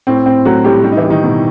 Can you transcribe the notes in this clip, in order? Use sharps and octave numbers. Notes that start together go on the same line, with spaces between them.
A2 C4
A2 C4
F#3 A3 F#4
A2 G3 G4
G3 G4
D#4
E3 E4
G3
D#3 D#4
B2